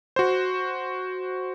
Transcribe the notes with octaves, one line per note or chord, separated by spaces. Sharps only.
F#4 C5